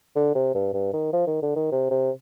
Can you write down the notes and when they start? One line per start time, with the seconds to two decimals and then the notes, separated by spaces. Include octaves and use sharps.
0.16 D3
0.35 C3
0.55 G2
0.74 G2
0.93 D#3
1.13 F3
1.27 D#3
1.42 D3
1.56 D#3
1.72 C3
1.91 C3